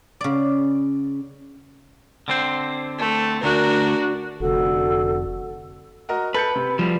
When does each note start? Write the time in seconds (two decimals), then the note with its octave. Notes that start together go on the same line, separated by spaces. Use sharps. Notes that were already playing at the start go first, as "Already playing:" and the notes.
0.21 C#3 D5
2.28 D3 C4 C5
2.99 A3
3.43 D2 D4 F#4 A#4
4.40 F1 D3 F#4 A4
6.09 F#4 A#4 D#5
6.34 A4 B4 G6 C#7
6.55 C3
6.79 F3 G3